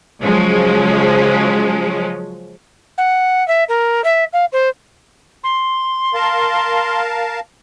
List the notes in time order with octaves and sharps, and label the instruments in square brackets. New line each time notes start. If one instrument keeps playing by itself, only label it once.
[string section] C#3 F3 F#3 G#3 C#4
[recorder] F#5
E5
A#4
E5
F5
C5
C6
[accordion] A#4 F5 A5